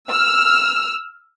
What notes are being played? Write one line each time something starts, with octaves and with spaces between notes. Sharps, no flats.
E6 F6